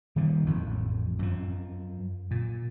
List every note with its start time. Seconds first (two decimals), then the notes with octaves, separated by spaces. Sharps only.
0.16 D#3 G3 A#3
0.46 A1 F2 A2
1.19 F#2 F3
2.31 A#2